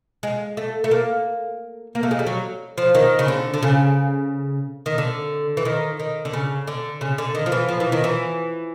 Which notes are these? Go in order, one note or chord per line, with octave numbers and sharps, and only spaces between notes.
G#3
A3
A3
A#3
A#3
A3
G#3
G3
F#3
F3
D#3
C#3
D3
D3
C#3
D#3
D3
E3
D#3
D#3
D3
C#3
D3
C#3
D3
D#3
F3
E3
F3
E3
D#3
E3